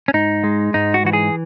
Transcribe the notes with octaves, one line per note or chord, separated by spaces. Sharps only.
C#4
G#2 D#4
G#3
G#2 D#4
F#4
E3 F#4
G#4